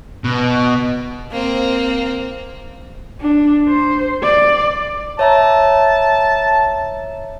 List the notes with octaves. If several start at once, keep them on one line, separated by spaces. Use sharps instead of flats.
B2
A#3 C4
D4
C5
D5
C#5 E5 A5 A#5